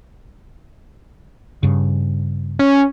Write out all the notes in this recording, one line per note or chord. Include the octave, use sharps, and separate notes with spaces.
G2 C#3
C#4